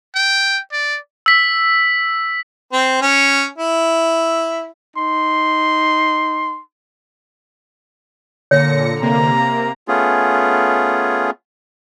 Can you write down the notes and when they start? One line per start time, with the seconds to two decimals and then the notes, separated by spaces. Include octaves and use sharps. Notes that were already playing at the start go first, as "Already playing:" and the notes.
0.15 G5
0.72 D5
1.26 E6 B6
2.72 C4
3.02 C#4
3.58 E4
4.96 D#4 C6
8.51 A#2 D3 C#5 A#6 C#7
9.01 C3 A#3 A#5
9.88 A3 B3 C#4 F4 G#4